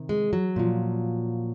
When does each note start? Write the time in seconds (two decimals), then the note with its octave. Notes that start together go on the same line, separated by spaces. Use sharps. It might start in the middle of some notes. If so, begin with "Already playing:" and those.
Already playing: C3 D#3
0.09 G#3
0.33 F#3
0.56 A#2 F3